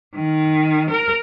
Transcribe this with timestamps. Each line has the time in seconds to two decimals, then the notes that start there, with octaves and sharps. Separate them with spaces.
0.16 D#3
0.90 A#4